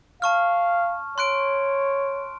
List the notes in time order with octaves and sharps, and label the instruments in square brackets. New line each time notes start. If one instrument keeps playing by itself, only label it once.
[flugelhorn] F5 [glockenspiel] A5 C#6 F6
[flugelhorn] C#5 [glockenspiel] C6 F#6 D7